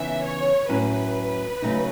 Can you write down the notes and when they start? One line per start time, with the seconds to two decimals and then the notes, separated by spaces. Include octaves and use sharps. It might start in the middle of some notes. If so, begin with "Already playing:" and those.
Already playing: C#3 E3 B3 D#4 E5
0.23 C#5
0.69 A2 F#3 C#4 E4 B4
1.62 C#3 F#3 A3 D#4